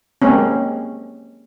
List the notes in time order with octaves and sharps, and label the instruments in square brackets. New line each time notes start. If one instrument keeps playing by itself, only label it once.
[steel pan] G#3 A#3 C4 C#4